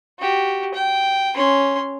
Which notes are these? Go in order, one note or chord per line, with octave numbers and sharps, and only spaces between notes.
F#4 G4
G5
C#4 C6